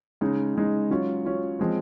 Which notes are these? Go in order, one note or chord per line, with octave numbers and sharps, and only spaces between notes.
C#3 G#3 D#4
C#3 G#3 D#4
F#3 C#4 F4
F#3 C#4 F4
F3 G#3 C4